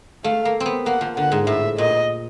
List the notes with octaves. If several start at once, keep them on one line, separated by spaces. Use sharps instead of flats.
A3 F5
A#3
C4
B3
A#3 F#5
F3
D3 F#5
G#2
A2 E5
A#2 D#5